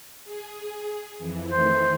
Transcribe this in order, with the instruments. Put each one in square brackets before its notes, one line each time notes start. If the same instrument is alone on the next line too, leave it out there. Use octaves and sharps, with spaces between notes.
[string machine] G#4
F2 E3
[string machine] D#3 E3 A3 [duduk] C5